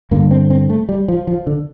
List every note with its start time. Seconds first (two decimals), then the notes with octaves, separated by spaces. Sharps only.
0.11 G2 D3 A#3
0.31 C4
0.50 C4
0.70 A3
0.89 G3
1.08 F3
1.27 F3
1.47 D3